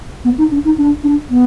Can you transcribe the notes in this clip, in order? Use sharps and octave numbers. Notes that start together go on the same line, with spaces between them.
B3
D#4
D4
D#4
D4
D4
B3